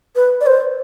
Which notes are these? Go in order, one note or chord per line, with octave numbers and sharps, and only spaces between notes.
B4
D5
C5